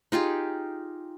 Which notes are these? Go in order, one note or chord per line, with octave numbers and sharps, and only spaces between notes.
D#4 F4 G4 G#4